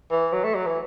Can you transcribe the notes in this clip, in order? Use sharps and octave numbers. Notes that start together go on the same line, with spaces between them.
E3
F#3
A3
F#3
E3